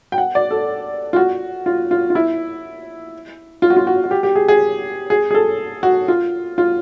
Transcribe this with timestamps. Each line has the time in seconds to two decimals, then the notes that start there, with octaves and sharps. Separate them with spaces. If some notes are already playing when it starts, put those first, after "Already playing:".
0.12 G5
0.18 F#5
0.35 D5
0.51 A4
1.13 F4
1.16 F#4
1.66 F4
1.91 F4
2.10 F4
2.15 E4
3.62 F4
3.70 F#4
3.76 F4
3.87 F#4
4.04 F#4
4.11 G4
4.23 G4
4.35 G#4
4.48 G#4
5.10 G#4
5.31 G#4
5.35 A4
5.83 F#4
6.08 F4
6.58 F4